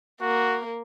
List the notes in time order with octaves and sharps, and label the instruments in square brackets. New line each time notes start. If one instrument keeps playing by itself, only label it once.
[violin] A#3 [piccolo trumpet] F#4